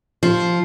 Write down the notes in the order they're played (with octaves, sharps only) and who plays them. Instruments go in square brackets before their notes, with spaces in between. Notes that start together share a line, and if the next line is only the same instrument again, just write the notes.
[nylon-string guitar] F3